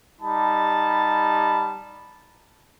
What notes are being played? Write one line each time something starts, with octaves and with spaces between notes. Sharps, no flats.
G3 D#4 G4 A5 B5